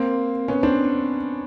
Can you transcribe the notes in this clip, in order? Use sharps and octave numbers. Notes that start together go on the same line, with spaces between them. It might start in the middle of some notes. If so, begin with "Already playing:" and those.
Already playing: A#3 C4
B3 C#4
C4 D4